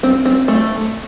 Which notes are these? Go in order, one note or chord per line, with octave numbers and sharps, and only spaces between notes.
C4
C4
A3